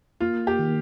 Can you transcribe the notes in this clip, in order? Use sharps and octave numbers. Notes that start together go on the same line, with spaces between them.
A#3 F4
G4
D#3